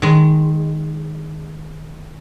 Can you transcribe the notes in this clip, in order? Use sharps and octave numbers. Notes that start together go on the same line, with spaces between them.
D#3 G#3